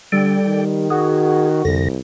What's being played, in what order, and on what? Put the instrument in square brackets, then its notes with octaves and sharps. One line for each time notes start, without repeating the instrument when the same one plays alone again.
[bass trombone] D3 [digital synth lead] G3 [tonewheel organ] A4 D5 G5
[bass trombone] D#3
[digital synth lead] F#4 [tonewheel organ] G#4
[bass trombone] C2 [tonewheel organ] F2 D3 A#6